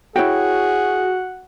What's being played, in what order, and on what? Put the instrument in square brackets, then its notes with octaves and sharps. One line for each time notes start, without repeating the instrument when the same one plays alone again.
[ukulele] E4 C#5 G5 [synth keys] F#4 [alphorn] G#4 [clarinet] F#5